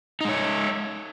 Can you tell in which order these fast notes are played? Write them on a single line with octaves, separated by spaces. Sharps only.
D#4 G#3 C#5